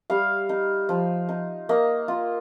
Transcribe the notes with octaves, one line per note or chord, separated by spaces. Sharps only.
G3 F5
D#4
F3
D#4
A#3 D#5
F4